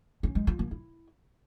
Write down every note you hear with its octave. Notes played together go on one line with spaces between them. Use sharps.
C#4
G#3
F4
A#3
E4